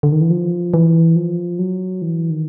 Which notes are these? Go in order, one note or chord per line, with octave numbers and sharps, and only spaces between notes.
D3
D#3
E3
F3
E3
F3
F#3
E3
D#3